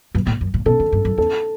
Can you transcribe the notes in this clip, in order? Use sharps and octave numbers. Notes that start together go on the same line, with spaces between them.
G2
A2
F#2
A2
B2 A4
D3
G2
F#2
E2 A4